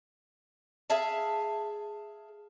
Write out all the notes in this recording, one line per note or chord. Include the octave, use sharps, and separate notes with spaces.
G#4 E5 F5 A5